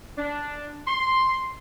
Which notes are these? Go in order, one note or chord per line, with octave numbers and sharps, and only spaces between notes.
D4
C6